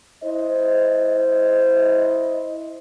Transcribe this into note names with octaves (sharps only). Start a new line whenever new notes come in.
E4 C5 D#5